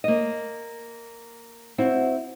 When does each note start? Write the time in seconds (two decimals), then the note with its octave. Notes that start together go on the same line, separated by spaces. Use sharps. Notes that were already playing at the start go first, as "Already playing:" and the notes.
0.04 A#3 D#5
1.78 C4 E4 F#4